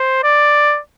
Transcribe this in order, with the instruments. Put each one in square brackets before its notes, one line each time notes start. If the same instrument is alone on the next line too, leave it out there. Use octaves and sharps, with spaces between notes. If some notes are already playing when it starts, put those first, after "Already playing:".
Already playing: [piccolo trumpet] C5
D5